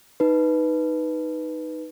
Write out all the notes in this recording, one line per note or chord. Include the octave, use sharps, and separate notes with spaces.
D#4 B4